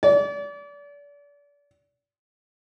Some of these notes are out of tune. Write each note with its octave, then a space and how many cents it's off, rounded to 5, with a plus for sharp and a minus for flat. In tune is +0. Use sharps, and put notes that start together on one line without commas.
D5 -35